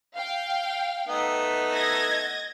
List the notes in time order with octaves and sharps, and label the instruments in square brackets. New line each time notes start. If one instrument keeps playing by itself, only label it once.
[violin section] F5 G5
[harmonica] A3 B3 D#4
[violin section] D#5 G#6 A#6